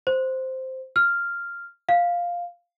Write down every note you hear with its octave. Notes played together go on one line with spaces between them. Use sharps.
C5
F6
F5